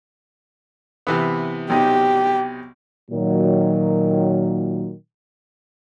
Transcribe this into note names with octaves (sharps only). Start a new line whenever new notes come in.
C3 E3 B3
B1 C3 D#4 G4
A#2 D#3 F#3